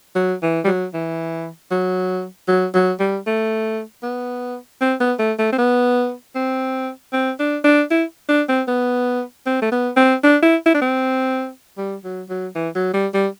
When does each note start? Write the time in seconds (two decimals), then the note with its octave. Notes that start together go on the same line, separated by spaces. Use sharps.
0.16 F#3
0.43 E3
0.64 G3
0.68 F#3
0.94 E3
1.71 F#3
2.48 F#3
2.74 F#3
3.00 G3
3.27 A3
4.03 B3
4.81 C4
5.00 B3
5.19 A3
5.39 A3
5.53 C4
5.58 B3
6.35 C4
7.13 C4
7.39 D4
7.64 D4
7.91 E4
8.29 D4
8.49 C4
8.68 B3
9.46 C4
9.62 A3
9.72 B3
9.97 C4
10.24 D4
10.43 E4
10.66 E4
10.74 D4
10.82 C4
11.78 G3
12.04 F#3
12.30 F#3
12.56 E3
12.75 F#3
12.94 G3
13.14 G3